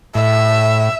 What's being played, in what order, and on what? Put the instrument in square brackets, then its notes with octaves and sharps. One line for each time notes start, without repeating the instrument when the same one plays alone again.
[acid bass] A2 [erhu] E5